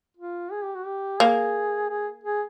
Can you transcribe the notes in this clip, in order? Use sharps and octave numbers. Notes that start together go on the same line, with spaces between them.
F4
G#4
G4
F#4
G4
A#3 G#4
G#4
G#4